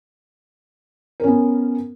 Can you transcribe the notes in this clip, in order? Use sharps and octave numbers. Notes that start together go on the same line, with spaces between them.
B3 C#4 A#4